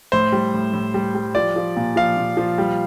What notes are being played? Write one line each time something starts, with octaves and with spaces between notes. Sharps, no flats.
A2 C5
G3
A2
A2
G3
G3
F3 D5
F3
A#2
F3 F5
A#2
F3
G3